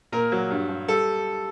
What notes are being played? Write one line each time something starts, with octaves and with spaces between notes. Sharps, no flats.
A#2 A#4
F#3
G2
G2
G3 A4